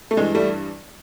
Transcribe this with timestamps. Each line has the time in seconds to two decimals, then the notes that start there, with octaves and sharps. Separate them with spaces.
0.11 A3
0.17 G2 E3 G#3
0.35 G3 A3